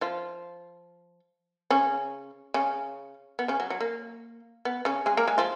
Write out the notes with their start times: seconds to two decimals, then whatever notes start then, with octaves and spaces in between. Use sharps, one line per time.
0.01 F3 F4
1.70 C#3 C#4
2.54 C#3 C#4
3.39 B3
3.48 C#3 C#4
3.60 F#3
3.70 F#3
3.80 A#3
4.65 B3
4.85 C#3 C#4
5.06 G#3 G#4
5.17 A#3 A#4
5.27 G#3 G#4
5.38 F3 F4